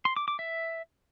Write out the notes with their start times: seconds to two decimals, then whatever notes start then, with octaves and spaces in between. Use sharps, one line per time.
0.05 C6
0.16 D6
0.28 D6
0.39 E5